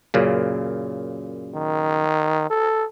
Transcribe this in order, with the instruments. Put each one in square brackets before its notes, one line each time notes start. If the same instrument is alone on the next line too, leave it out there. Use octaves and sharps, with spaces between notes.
[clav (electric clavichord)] F#2 A#2 C#3
[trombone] D#3
A4